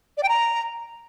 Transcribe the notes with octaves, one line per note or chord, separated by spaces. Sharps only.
D5
G5
A#5